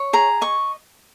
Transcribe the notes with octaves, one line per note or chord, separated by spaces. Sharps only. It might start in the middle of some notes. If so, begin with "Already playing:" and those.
Already playing: C#5
G#4 A#5
D#5 C#6